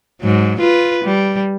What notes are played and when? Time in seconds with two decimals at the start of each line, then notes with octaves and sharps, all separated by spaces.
0.21 G#2 F#3
0.60 F4 B4
1.04 G3